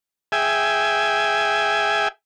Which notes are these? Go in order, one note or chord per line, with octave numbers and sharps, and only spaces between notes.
G#4 E5 G5 G#5